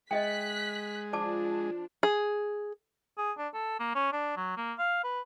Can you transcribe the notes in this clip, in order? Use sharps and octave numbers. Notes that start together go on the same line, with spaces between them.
G#3 D#5 E5 G5 F#6 B6
F3 D4 D5 A5 D6
G#4
G#4
D4
A4
A#3
C#4
D4
F#3
A#3
F5
B4